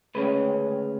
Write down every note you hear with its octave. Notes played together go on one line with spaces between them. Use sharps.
D2 C#3 G#3 C#4 B4